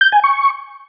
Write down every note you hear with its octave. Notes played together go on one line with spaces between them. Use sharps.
G6
G#5
C#6